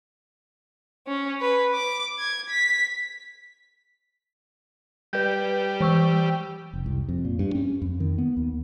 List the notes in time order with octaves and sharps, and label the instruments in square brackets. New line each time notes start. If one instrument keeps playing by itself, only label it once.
[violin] C#4
B4
D6
G#6
B6
[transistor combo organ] G3 [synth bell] B4 G6
[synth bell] E3 C#6 E6
[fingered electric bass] F1
C2
F2
A#2
G2
C#4
F2
D#3
B3
D#2